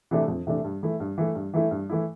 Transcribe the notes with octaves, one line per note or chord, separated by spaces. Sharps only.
C3 E3 A3 D4
F2
C3 E3 A3 D4
G2
E3 A3 E4
G2
E3 A3 E4
G2
E3 A3 E4
G2
E3 A3 E4